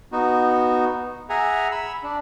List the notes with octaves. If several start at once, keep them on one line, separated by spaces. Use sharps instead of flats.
B3 D#4 F#4
G#4 E5 F#5 G#5 A#5
B5 E6
D4